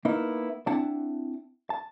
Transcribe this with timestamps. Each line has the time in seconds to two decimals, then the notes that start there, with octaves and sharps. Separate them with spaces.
0.05 A#3 B3 D#4 E4
0.67 C4 D4 E4 F#5 A5
1.70 A5